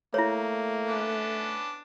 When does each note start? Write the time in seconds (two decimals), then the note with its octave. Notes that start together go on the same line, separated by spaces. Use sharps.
0.14 A3 A#3 E4 C#5
0.87 B3 C#4 D4